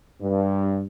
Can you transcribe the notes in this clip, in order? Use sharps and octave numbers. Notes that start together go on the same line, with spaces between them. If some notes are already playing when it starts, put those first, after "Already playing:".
G2